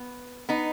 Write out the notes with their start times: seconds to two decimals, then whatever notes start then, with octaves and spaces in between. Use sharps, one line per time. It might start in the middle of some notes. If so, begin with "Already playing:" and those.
Already playing: B3
0.49 B3 D#4